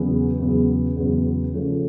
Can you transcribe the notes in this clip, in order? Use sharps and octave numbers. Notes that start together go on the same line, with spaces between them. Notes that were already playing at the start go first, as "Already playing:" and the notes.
Already playing: E2 C#3 F#3 B3
E2 C#3 F#3 B3
E2 C#3 F#3 B3
C#3 F3 A3 C#4